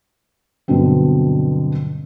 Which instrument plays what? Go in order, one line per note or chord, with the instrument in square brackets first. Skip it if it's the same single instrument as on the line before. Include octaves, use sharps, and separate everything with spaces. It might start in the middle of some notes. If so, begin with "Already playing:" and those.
[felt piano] G2 B2 D3 F#3 C4